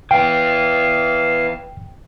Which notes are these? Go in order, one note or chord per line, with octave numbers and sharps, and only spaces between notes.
E3 B3 F5 G5